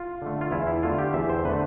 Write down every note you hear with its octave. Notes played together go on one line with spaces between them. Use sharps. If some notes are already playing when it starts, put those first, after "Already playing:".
Already playing: F4
D3 A3
F4
E2 E4
E4
D3 A3 F4
G4
E2 E5
C5
D3 A3 B4